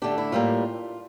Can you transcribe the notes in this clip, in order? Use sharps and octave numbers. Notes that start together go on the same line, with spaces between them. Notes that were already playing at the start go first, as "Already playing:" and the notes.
D3 A3 D4 G4
E4
A2 G3 A#3 F4